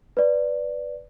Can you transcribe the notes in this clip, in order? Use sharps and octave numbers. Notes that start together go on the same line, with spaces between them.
B4 D5